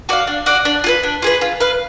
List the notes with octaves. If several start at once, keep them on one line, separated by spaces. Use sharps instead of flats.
F#4 D5 F5
D4
F#4 D5 F5
D4
F4 G#4 B4
D4
F4 G#4 B4
F4
B4 F5